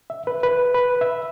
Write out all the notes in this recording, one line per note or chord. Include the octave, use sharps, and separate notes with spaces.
E5
B4
B4
B4
E5